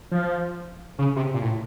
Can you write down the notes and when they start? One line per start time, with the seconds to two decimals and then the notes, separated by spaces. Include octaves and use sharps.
0.11 F3
0.99 C#3
1.16 C3
1.34 A#2
1.42 A2